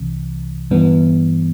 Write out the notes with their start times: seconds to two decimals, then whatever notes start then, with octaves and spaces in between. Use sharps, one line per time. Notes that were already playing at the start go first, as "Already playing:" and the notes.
Already playing: C2 C3 E3
0.71 G2 E3 B3